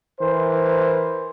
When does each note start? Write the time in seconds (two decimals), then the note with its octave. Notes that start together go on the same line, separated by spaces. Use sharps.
0.20 E3 A#4 C5